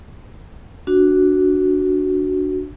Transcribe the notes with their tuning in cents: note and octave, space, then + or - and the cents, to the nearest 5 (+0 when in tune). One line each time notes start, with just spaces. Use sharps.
D4 +0 F#4 +0